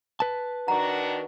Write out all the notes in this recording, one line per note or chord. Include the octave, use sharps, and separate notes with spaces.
B4 A5
D#3 D4 F#4 F#5 A#5